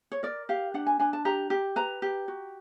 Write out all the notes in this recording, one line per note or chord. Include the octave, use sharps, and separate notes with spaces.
C#5
A#4 D5
G4 F5
D4 F#5
G#5
D4 G#5
A5
G4 A#5
G4
B4 A#5
G4
F#4